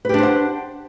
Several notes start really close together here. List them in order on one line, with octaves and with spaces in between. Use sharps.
B4 G4 D4 C5 F#5